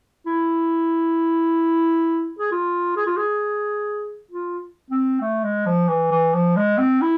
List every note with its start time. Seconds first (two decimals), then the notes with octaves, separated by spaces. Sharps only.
0.27 E4
2.39 G#4
2.52 F4
2.97 G#4
3.07 F4
3.17 G#4
4.31 F4
4.91 C4
5.21 A3
5.44 G#3
5.66 F3
5.89 E3
6.11 E3
6.34 F3
6.57 G#3
6.78 C4
7.01 E4